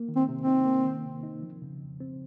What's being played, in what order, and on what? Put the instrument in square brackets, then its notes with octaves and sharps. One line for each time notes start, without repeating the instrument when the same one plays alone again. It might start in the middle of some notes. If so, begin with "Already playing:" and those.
Already playing: [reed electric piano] A#3
D#3
[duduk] C4
[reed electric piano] C3
[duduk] C4
[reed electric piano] D#4
A#3
D#3
C3
D#4
F3
C#3
F2
C4